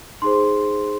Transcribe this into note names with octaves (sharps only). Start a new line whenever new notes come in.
D#4 G#4 C5 C6